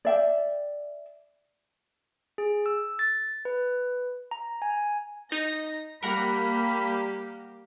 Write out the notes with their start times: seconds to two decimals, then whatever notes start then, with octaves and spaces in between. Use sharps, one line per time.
0.05 D5 E5 G5
2.38 G#4
2.66 E6
2.99 A6
3.45 B4
4.31 A#5
4.62 G#5
5.32 D#4 A#6
6.03 G3 A#3 G4 A#4 F#5 A#5 B5